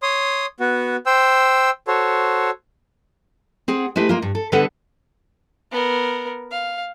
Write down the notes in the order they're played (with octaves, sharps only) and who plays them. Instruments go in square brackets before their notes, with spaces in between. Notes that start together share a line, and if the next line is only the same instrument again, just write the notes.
[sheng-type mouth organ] C#5 C6 D#6
B3 F#4
C5 G5 E6
F#4 A4 C5 C#5
[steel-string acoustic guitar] C4 G#4 F#5
G#3 A3 E4 G4 B4
G#3 A#3 F4
G2
A4
D3 G3 B3 A4 B4 F#5
[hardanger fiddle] B3 A#4
F5